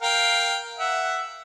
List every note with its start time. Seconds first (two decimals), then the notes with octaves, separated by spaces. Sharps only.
0.02 A#4 F5 G5
0.79 E5 F#5